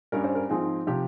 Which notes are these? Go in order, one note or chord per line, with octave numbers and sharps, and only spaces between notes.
G2 G3 C#4 A#4
C5
A#4
G#2 F3 C4 D#4 G#4
C3 F3 G4